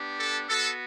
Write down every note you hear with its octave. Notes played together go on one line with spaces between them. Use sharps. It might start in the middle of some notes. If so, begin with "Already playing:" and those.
Already playing: B3 D4 G4
A4
B3 F#4 A4